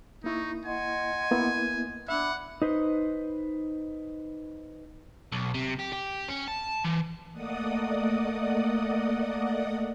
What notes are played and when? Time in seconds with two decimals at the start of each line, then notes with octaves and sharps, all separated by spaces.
0.24 A#3 D#4 E4 C#6
0.65 D#5 F#5 G#5 C6
1.31 A#3 B3 E4
2.08 D4 E5 F#5 B5 D6
2.62 D#4 B4 C5
5.32 B1
5.54 C3
5.79 G4
5.93 G4
6.29 C#4
6.48 A5
6.85 E3
7.32 A3 A#3 D5 D#5 F#5 D#6